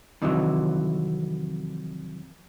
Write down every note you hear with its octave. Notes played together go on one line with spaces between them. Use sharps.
F2 C3 D#3 E3 F#3